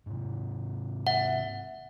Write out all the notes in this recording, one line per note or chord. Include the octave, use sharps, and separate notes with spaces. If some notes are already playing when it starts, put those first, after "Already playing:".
G#2 C3
E5 F#5